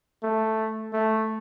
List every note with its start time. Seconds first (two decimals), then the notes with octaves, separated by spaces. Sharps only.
0.23 A3
0.93 A3